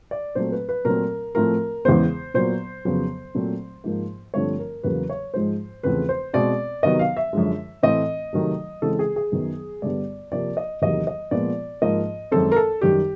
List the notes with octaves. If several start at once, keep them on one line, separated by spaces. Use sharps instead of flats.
D5
A#2 F#3 A3 C4 C5
B4
B4
A#2 F#3 A3 C4 A#4
A2 F3 A3 C4 A#4
E2 C#3 E3 G#3 B3 C5
A#2 F#3 B3 C5
F2 C#3 F#3 B3
A#2 F#3 A3 C4
G#2 F3 A#3
G2 D3 F3 A3 C4 C#5
A#4
E2 C#3 F#3 A#3 B4
C#5
G#2 F3 G#3 C5
E2 C#3 F3 A3 C4 B4
C5
B2 G#3 C4 D5
C3 D#3 F#3 B3 D#5
F5
E5
F#2 D3 F3 G#3
A2 E3 A3 C4 D#5
C3 D#3 F#3 A3
C#3 E3 G#3 C4 A4
G#4
G#4
F#2 D#3 F#3 B3
G2 D3 G3 B3 D5
C3 F3 A#3 D5
D#5
E2 C3 D#3 F#3 A#3 D#5
D#5
A#2 F3 G#3 B3 D5
G#2 F3 A#3 D#5
F#2 D#3 G#3 C4 A4
A#4
A4
F#2 D#3 G3 G4